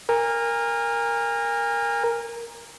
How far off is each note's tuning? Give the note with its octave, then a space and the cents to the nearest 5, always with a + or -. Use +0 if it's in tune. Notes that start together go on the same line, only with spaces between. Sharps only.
A#4 +0 G#5 -35